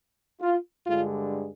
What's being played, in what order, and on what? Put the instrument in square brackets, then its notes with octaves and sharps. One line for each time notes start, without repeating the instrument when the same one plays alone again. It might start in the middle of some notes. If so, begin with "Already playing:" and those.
[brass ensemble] F4
G2 D3 G#3 F4